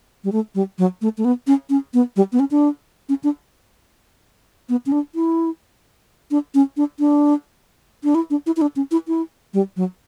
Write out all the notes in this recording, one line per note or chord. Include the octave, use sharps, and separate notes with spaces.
G3
A3
G3
F#3
A3
A3
B3
C#4
C#4
B3
G3
B3
C#4
D4
C#4
D4
B3
C#4
D4
E4
D4
C#4
D4
D4
D4
E4
D4
E4
E4
D4
C#4
E4
E4
G3
F#3